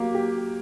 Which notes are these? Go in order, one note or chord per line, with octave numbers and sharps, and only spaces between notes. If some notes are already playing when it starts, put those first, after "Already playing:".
Already playing: F#3 A#3 G4
G4